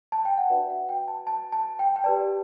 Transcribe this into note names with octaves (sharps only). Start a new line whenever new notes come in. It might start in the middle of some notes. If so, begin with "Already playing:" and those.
A5
G5
F#5
D4 F#4 B4 D5 E5
F#5
G5
A5
A5
A5
G5
G5
G4 B4 D5 A5